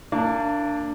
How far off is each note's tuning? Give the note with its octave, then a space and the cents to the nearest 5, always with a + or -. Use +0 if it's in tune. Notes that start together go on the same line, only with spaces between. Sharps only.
A#3 -30 D4 +0